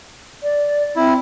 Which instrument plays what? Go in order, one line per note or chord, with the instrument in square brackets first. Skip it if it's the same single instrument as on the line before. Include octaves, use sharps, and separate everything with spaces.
[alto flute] D5
[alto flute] C4 [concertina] E4